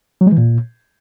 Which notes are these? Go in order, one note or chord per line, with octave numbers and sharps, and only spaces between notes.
F#3
G#3
E3
A#2